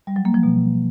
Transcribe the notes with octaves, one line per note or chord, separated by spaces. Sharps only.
G3
F#3
A#3
F3
B2